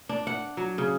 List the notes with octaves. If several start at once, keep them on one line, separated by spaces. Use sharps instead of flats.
D4
F#5
F#3
C#3